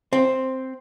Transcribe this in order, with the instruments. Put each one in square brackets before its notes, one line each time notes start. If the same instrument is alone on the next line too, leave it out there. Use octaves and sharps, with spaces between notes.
[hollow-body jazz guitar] C4